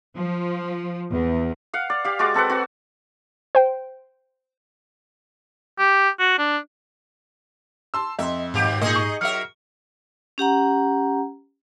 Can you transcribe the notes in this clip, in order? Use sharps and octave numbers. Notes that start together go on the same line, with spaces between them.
F3
E2
F5 F#5
D5
G4 F5
G#3 F#4 D5 D6
C4 A4 B4 F#5
C4 F#4
C5 G5
G4
F#4
D4
A5 C6 E6
F2 D#5 E5 C6
D#2 G#2 B2 G4
A#2 D#4 G#4 D#5
C#6
F#3 A#4 E5 F6 C#7
C#4 G4 F#5 A#5